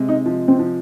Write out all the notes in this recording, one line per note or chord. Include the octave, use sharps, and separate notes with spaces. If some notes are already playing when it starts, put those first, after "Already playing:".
Already playing: C3 G#3
D#4
F3
C4
F3